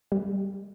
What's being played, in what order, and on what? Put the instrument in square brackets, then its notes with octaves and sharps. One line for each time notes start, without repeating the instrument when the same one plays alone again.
[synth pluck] G3